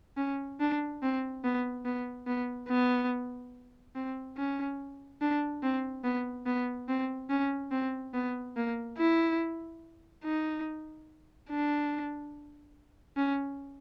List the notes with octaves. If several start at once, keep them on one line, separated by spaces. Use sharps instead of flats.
C#4
D4
C4
B3
B3
B3
B3
C4
C#4
D4
C4
B3
B3
C4
C#4
C4
B3
A#3
E4
D#4
D4
C#4